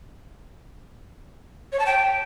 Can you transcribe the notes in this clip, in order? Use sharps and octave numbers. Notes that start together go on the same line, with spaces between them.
C#5
A5
G5